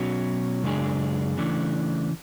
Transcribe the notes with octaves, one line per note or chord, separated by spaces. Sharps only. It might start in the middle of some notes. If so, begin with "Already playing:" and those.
Already playing: B2 F#3 C#4
F#2 C#3 G#3 D4 G#4
C#3 E3 A3 D4